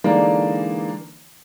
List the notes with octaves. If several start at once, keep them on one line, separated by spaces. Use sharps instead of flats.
D3 E3 G#3 A#3 D#4 D5